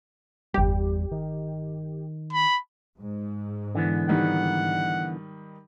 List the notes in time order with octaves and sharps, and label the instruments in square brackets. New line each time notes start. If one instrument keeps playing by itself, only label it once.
[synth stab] G1 G4 [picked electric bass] E2 G3
[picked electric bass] D#3
[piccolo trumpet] B5
[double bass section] G#2
[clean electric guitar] D3 E3 B3
[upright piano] D#3 G3 D#4 [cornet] F#5